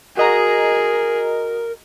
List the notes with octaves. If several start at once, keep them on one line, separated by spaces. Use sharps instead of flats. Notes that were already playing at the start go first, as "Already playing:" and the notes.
F#4 G#4 A#4 D#5 A#5